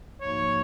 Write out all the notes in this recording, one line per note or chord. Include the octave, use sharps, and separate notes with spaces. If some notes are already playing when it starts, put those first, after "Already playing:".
G#2 F3 A#3 D#4 F#4 C#5